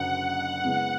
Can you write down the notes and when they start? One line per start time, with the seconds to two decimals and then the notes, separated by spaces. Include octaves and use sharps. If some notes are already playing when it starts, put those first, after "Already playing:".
Already playing: F#1 F#2 D3 F#5
0.64 C#3 G#3 B3 E4 G#4